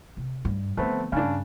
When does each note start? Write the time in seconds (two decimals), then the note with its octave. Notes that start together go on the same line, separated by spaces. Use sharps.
0.17 C3
0.45 G2
0.77 D3 F3 A3 B3 C4
1.12 G2 C#3 D4